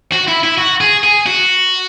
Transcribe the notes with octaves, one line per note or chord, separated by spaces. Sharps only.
F#4
E4
E4
F#4
G#4
G#4
F#4